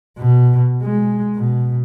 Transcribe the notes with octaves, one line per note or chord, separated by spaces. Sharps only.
B2
G#3
B2